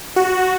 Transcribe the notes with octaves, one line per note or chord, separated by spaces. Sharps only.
F#4